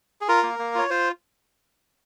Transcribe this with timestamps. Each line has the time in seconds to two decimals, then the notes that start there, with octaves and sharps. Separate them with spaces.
0.21 G#4
0.28 F4 A#4
0.43 A#3
0.59 A#3
0.75 F4 C#5
0.90 F4 C5